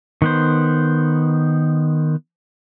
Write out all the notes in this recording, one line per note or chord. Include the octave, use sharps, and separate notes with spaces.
D#3 B3 C5